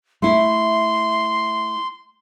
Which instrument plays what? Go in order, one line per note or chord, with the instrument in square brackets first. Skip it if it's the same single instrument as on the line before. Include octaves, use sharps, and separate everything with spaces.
[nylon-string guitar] A3 E4 [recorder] C6